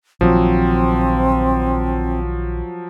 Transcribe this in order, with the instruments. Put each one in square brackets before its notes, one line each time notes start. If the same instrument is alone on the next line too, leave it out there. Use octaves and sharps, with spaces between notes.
[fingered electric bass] A#1 D#3 A#3 [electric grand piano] F3 F#3 [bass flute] C4